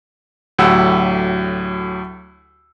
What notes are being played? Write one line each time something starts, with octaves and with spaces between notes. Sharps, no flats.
D2 A2 F#3 G4 F#5 E6